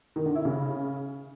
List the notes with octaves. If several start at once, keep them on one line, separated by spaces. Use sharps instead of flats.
D#3
D3
E4
C#3